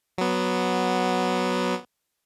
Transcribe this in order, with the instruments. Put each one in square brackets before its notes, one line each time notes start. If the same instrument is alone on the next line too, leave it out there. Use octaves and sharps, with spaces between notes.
[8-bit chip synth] F#3 B3